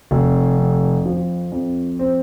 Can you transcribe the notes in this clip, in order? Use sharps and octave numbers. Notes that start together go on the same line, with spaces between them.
F1
F2
F3
F2
C4